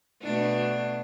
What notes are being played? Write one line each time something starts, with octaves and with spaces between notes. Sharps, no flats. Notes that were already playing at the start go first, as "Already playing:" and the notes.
B2 A3 D4